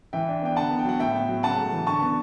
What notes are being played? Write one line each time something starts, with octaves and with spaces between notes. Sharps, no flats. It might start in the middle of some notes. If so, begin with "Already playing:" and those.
E3 E5 G5
D4
B3 G5
D3 F#5 A5
B3
G5
F#3 F#5
A2 E5 G5
B3
F#3
C#3 F#5 A5
A3
E3
D3 A5 C#6
B3